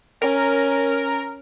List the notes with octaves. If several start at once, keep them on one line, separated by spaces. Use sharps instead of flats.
C#4 A#4